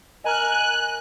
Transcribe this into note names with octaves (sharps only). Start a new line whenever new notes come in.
A#4 D#5 G#5 A#5 F6 F#6